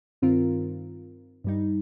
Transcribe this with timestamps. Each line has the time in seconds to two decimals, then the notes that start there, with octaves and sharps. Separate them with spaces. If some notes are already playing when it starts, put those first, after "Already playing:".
0.22 G2 D#3 C4 F4 A#4
1.44 G2 G3 D#4